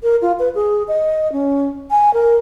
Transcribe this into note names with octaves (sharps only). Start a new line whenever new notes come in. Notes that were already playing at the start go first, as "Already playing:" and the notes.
A#4
F4
B4
G#4
D#5
C#4
G#5
A#4